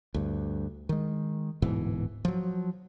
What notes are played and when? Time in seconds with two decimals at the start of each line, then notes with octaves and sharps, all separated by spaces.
0.14 D2 G2
0.89 D#3 G#3
1.62 D1 G#2 B2 E3
2.25 F3 F#3